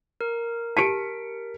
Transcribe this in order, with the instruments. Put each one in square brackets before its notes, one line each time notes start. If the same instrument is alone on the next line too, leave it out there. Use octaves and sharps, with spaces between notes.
[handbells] A#4
[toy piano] G4 A5 [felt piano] B6 C#7 D7